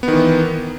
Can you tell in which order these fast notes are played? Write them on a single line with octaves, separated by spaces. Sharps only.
B3 D#3 E3